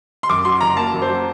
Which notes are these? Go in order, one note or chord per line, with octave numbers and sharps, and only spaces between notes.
C6
F#2 D6
F#3 C6
F#1 A#5
A#3 A5
F#2
C5
F#3